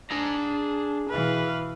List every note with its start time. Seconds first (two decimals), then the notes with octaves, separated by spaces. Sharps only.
0.11 D4 G#4 A#5
1.09 B2 E3 B4 F5